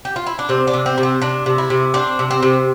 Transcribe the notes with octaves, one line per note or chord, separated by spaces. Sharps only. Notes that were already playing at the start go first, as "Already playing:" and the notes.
G4
F4
E4
D4
C3 C4
D4
C3
C4
C3
C4
C3 D4
C3
E4
C3
C4 D4
C3
C4
C3